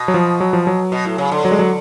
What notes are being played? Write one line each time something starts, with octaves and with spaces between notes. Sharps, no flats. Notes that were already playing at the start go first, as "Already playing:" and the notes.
Already playing: B2
F#3
F3
F#3
F3
F#3
B2
A2
C#3
D3
F#3
G#3
F#3